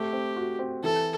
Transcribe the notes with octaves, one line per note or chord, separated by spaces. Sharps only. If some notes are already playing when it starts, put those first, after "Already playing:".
Already playing: A3 C4 G4
C4
F#4
C4
E3 A4